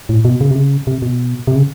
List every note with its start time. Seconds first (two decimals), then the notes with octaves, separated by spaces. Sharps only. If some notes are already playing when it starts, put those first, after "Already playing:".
0.09 A2
0.25 B2
0.41 C#3
0.51 C3
0.55 C#3
0.87 C3
1.02 B2
1.47 C3
1.55 C#3